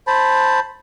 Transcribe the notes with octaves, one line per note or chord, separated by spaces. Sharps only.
C5 A5 B5